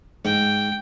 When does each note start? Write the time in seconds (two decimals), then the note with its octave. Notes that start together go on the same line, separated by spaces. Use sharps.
0.25 G#2 G5